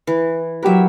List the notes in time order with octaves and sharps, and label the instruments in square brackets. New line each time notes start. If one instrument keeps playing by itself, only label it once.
[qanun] E3
[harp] F#3 G4 B4 [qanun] A#4 E5